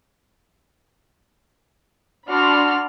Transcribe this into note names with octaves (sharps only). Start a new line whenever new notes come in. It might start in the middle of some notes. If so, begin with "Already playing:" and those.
D4 F#4 D5 B5 C6 F6